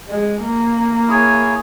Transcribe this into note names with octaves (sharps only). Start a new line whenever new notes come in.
G#3
A#3
E4 G#4 C#5 G#5